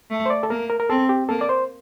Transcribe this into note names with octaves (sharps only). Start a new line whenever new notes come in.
A3
C5
D5
A4
A#3 A#4
A#4
A#4
C4 A4
G4
A#3 A4
D5
C5